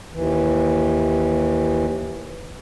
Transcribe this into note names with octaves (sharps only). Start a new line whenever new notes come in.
D#2 E3